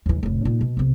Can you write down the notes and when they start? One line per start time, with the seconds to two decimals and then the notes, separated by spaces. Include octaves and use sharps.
0.06 D#2 E3
0.23 F1 A2
0.45 A#2 D#4
0.61 B2
0.77 B1 C3